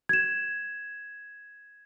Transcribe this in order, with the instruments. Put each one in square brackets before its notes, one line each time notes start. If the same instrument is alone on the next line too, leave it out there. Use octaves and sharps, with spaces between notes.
[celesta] G#6 E7